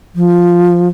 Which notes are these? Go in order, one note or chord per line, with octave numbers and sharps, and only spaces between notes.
F3